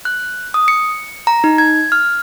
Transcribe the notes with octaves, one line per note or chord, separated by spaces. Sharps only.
F#6
D#6
C#7
A#5
D#4
G#6
F6